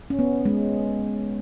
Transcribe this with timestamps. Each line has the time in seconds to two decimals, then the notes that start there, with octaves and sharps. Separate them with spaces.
0.10 C#4
0.19 B3
0.45 G#3